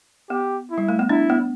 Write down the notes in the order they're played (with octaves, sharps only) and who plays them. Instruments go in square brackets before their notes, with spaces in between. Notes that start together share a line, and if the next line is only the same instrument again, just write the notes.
[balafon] B3 [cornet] G4
[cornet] E4
[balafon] G3
A3
B3
[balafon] D4 [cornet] E4
[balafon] B3